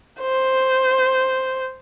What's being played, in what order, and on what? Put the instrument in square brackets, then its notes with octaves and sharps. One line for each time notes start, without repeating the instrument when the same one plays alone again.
[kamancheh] C5